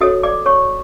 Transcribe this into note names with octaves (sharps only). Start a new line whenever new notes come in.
F#4 A4 C#5 D#5 D#6
D5 D6
C#5 C#6